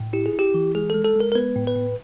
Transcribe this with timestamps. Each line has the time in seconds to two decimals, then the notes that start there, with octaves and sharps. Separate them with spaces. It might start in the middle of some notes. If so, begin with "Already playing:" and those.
Already playing: A2
0.13 E4 G4
0.26 G#4
0.33 E4
0.39 G4
0.54 E3
0.75 G#3 G#4
0.90 G#3 A4
1.05 A4
1.16 G#3 A#4
1.32 A#4
1.35 B3 B4
1.56 A2
1.67 B4
1.76 A2